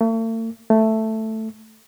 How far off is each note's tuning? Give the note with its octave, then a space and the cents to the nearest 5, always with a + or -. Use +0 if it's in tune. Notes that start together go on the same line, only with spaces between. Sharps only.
A3 +45
A3 +5